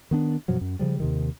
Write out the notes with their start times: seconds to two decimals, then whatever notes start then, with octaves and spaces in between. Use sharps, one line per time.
0.11 D#3 B3 D4
0.48 F#2 B2 F3 F#3
0.61 F#2
0.79 C#3 F3 G3
1.00 D#2 C3 D#3